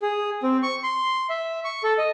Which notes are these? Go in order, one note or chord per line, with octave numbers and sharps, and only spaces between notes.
G#4
C4
C#6
C6
E5
C#6
A4
D#5